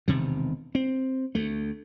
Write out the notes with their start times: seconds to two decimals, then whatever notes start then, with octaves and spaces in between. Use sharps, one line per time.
0.08 E1 C3 D#3
0.75 C4
1.35 D2 A3